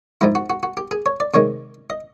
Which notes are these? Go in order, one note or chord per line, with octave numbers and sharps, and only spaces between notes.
G#2 F3 G#3 E4
F#4
F#4
F#4
G4
G#4
C#5
D5
C3 D#3 G#3 C#5
D#5